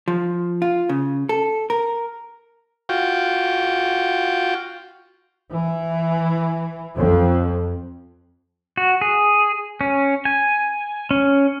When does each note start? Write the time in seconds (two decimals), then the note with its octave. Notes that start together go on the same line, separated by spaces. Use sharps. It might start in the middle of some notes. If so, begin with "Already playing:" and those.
0.08 F3
0.62 F4
0.89 C#3
1.29 A4
1.70 A#4
2.89 F4 F#4 G5
5.52 E3
6.96 F2
8.77 F#4
9.01 G#4
9.81 C#4
10.25 G#5
11.11 C#4